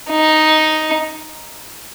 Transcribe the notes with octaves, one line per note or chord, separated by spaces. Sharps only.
D#4